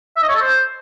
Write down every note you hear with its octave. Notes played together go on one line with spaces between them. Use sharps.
E5
D#5
C#5
A4
C5